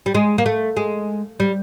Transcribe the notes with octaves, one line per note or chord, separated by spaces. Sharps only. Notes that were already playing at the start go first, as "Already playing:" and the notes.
G3
G#3
A#3
A3
G#3
G3